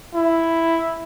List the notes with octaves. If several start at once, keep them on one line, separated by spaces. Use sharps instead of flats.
E4